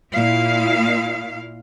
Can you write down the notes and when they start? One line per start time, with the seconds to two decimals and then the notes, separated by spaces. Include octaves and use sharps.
0.11 A#2 E4 F5